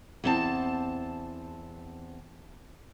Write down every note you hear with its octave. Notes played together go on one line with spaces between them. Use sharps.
E2 C4 A5